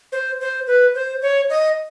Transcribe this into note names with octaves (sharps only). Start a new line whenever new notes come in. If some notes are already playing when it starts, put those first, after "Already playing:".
C5
C5
B4
C5
C#5
D#5